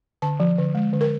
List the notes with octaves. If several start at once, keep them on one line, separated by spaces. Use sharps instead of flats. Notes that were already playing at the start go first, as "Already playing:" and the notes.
D3 A5
F3
D3
G#3
D3
A#4